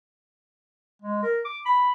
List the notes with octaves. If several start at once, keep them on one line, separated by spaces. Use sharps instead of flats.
G#3
A#4
D6
B5